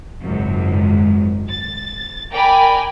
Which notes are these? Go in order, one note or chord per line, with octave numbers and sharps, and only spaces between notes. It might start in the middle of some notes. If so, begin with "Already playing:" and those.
G#1 C#2 F#2
A6
A#4 D5 G5 G#5 A#5 B5